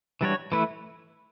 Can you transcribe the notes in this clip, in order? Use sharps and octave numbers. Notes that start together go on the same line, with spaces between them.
E3 G3 D4 F#4 C#5
E3 A3 E4 B4